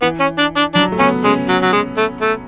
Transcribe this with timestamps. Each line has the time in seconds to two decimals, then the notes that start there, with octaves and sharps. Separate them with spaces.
0.02 E3 B3
0.20 C#4
0.39 D4
0.57 D4
0.75 F#3 D4
0.92 A3
0.99 B3 C#4
1.24 G#3 C#4
1.49 F#3
1.62 F#3
1.73 G#3
1.97 A3
2.21 A3